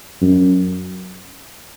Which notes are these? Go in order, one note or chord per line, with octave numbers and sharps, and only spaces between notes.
F#2